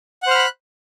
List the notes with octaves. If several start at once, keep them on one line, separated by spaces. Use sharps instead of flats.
C5 F#5 B5 F6 F#6